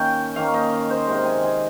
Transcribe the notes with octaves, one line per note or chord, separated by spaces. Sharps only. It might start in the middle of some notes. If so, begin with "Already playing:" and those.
Already playing: D#3 A#3 C#4 G5
D#3 A#3 C#4 F5
D#5
C5
C3 D#3 G#3
G#5
G#5